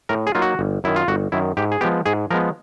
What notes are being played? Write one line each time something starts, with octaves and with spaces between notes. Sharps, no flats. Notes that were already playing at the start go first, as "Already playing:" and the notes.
A2 A#4
G#4
F#3 A#3 D#4 F4
F#4
G1
F#2 D#3 E4
F4
G1 F#4
F#2 D#3 E4
G#2 G4
G#4
F3 G#3 B3 G4
G#2 G#4
F3 G#3 B3 A#4